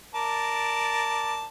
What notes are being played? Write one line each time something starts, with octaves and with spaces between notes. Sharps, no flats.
A#4 D5 A5